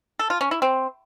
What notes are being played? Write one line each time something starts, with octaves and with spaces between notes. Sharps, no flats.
A4
F4
C#4
E4
C4